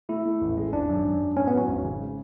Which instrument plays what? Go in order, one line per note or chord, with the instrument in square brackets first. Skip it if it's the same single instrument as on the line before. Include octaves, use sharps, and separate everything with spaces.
[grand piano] A3 [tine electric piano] E4
[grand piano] A3
A1
G#3
[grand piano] G#1 [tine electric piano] D4
[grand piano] F#2
F#2
F#2
[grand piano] A2 [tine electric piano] C#4
[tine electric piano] B3
[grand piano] F#3 [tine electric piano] C#4
[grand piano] G#1
C#3
G#3